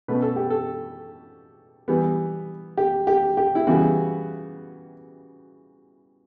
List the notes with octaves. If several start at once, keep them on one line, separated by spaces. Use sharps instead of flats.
B2 A3 C#4 B4
A4
G4
A4
E3 G3 B3
G4
G4
G4
E4
C#3 E3 G3 B3 F#4